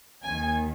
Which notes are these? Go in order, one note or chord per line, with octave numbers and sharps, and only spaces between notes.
D#2 D#3 G#5